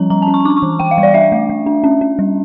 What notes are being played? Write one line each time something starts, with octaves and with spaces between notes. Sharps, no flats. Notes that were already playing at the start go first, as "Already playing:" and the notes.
Already playing: F3 G3 C#4 A#5
G3 A#5
A5
C#4
C#6
D4 D6
C#6
E3
E3 G5
F5
G3
D5
D4 E5
A3
A3
D4
C#4
C#4
G3